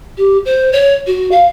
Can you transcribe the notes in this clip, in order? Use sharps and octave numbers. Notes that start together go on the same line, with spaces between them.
G4
C5
C#5
F#4
F5